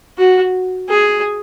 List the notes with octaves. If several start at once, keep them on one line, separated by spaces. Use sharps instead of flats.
F#4
G#4